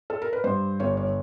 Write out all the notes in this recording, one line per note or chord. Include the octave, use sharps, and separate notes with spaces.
A4
A#4
B4
G2 C5
G1 C#5
C#5